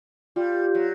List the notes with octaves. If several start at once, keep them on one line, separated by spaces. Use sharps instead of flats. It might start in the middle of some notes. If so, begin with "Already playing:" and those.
G3 F4
F#3